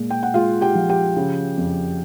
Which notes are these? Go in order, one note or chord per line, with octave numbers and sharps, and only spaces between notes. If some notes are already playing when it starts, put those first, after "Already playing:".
Already playing: A#2 G#3
G5
F#5
G#3 F4 F5
G4 G5
F3
G4 G5
C#3
F2